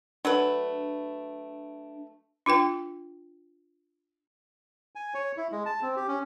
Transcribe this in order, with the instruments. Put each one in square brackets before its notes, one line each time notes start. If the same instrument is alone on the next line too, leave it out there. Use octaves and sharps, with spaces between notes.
[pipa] F#3 A3 B4 [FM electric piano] D4
[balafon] D4 F4 B4 G5
[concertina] G#5
C#5
E4
G#3
A5
C4
G4
C#4